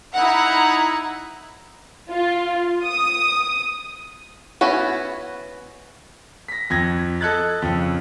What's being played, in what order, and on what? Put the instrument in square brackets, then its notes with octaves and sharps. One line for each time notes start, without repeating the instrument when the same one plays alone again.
[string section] D#4 E4 F#5 A#5
[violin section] F4
D#6
[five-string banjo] B3 C#4 E4 F#4
[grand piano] A#6 B6
F2 G#6 A#6
A4 D#5 F#6 G#6 A6
F2 C#3